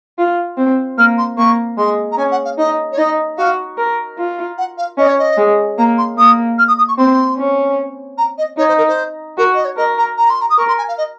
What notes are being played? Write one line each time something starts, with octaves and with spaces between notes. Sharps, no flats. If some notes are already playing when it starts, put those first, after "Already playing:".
F4
C4
A#3 F6
C6
A#3 C#6
G#3 C6
A#5
C#4 G#5
F#5
F5
D#4 D#5
C#5
D#4 D#5
F#4 F5
A#4
F4
F#5
F5
C#4 D#5
C#5
D#5
G#3
A#3 A#5
C6
A#3 D#6
F6
D#6
D#6
C#6
C4 C6
C#4
A#5
D#5
D#4 C#5
C5
A#4
C5
F#4 A#4
D#5
C#5
A#4 D#5
A#5
A#5
C6
A#5
D#6
A#4 C#6
C6
G#5
F5
D#5